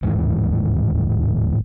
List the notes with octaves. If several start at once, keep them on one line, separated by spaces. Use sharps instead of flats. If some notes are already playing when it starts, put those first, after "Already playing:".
D1 D#2 G#2 E3